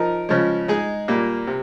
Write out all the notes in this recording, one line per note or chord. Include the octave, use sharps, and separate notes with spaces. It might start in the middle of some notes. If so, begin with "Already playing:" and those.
Already playing: F3 D#4 A#4
C#3 F3 G#3
G#3 D#4 G#4
A#2 G3 A#3
C3